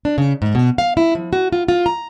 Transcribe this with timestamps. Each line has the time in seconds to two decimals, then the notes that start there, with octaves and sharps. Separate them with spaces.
0.05 D4
0.18 C#3
0.42 G#2
0.55 B2
0.78 F5
0.97 E4
1.15 F3
1.33 F#4
1.52 F4
1.68 F4
1.86 A#5